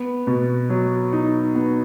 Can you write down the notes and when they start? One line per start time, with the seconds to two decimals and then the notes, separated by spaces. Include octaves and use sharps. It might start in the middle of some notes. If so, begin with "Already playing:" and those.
Already playing: B3
0.27 B2
0.70 F#3
1.13 D#4
1.55 B3